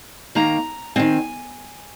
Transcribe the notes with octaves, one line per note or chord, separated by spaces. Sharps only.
D#3 A#3 A#5
D#3 G#3 C4 G#5